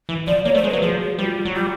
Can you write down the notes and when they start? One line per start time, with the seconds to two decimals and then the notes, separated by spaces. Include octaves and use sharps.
0.09 E3
0.27 F3 D5
0.45 A#3 C#5
0.55 A3 C5
0.64 G#3
0.69 B4
0.73 F#3
0.82 F3 G#4
1.01 F#4
1.18 G3 F4
1.45 F#3
1.56 G3 F4